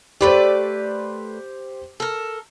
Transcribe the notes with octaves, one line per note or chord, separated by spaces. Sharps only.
A3 G4 B4 C5 D5
A4 A#4